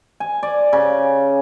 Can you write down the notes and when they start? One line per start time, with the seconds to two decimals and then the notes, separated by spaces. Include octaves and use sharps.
0.20 G#5
0.43 D5
0.73 C#3